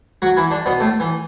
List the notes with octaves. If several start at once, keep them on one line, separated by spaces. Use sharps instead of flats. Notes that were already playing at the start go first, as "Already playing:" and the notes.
F#3 F#4
E3 E4
D3 D4
B2 B3
A2 A3
E3